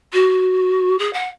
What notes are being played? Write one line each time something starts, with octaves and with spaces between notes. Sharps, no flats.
F#4
G#4
F#5